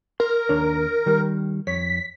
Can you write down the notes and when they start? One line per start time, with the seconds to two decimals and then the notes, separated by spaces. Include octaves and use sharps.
0.20 A#4 C6
0.49 D#2 D4 C#5
1.06 D#3 G3
1.67 F2 C#5 B6